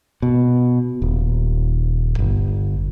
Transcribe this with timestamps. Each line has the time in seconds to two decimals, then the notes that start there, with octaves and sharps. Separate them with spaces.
0.22 B2
1.02 D#1
2.19 G1